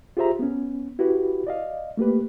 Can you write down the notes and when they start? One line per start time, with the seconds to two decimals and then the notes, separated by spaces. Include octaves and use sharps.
0.17 F4 G4 G#4 C5 E5 A#5
0.39 B3 C#4
0.99 E4 F#4 G4 B4
1.47 D5 D#5 F5
1.97 A3 A#3 G4 B4